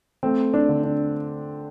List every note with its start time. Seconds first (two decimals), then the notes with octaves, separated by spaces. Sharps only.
0.23 A3 C4
0.54 D4
0.69 D3
0.83 D4